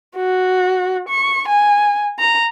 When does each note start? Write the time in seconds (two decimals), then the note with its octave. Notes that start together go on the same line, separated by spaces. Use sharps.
0.16 F#4
1.08 C#6
1.48 G#5
2.19 A#5